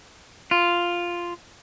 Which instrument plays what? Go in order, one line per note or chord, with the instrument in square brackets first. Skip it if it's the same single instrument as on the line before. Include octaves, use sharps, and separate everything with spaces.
[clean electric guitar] F4